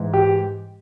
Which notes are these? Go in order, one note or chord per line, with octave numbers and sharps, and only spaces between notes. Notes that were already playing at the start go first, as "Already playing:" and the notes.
Already playing: G#2 E3
G4